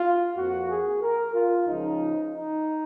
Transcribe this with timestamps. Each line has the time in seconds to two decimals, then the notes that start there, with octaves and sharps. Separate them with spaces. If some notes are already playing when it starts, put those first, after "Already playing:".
Already playing: F4
0.36 F2 F3 A#3 F#4
0.69 G#4
1.01 A#4
1.34 F4
1.66 C#2 C#3 F3 D#4
2.32 D#4